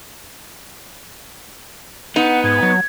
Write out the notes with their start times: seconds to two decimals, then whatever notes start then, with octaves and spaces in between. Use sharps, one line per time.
2.16 B3 D#4 F#5
2.44 G#2 G#6
2.63 F#3